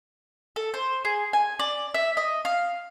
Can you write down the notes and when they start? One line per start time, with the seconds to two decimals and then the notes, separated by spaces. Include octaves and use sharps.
0.56 A4
0.74 C5
1.05 G#4
1.33 G#5
1.59 D5
1.94 E5
2.17 D#5
2.45 F5